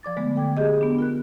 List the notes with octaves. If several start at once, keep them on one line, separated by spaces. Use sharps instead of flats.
F3 D5 D6 A6
D3 G#3 A3 B3
A4 G5 D6 G#6
G4 G#4 D#5
B3 D4
F4 A#4 F#6